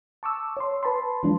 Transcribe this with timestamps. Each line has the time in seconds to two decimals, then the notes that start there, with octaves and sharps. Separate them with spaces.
0.23 A5 C#6 D6 E6
0.57 C#5 C6
0.83 B4 A5 B5 C6
1.23 E3 F#3 G#3 D4 F4